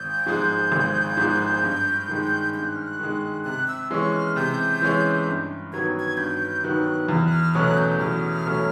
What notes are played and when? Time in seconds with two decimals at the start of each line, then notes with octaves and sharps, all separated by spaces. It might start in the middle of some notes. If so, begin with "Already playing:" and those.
Already playing: G#1 G6
0.26 G#2 F3 G#3
0.72 G#1
1.17 G#2 F3 G#3
1.63 G2
2.08 D#3 G#3
2.54 G2 G6
2.64 F#6
2.76 F6
2.86 F#6
2.99 D#3 G#3
3.44 C3 F#6
3.68 E6
3.90 E3 G#3 C#4 C#6 E6
4.13 F#6
4.16 F6
4.36 C3 G6
4.82 E3 G#3 C#4
5.27 G2
5.73 D#3 F#3 B3 G#6
5.99 G#6
6.17 G2 G6
6.64 D#3 F#3 B3 F#6
7.08 E2 F6
7.24 F#6
7.32 F6
7.54 B2 F#3 A3 C#4 F#6
7.78 G6
7.99 E2 F6
8.46 B2 F#3 A3 C#4